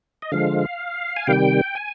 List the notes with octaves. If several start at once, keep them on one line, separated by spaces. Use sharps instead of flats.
D#5
D3 F3 G#3 F5
G#5
C3 D#3 G3 G5
G#5